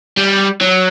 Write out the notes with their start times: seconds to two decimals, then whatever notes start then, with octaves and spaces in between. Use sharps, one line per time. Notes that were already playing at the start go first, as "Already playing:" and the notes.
0.17 G3
0.61 F#3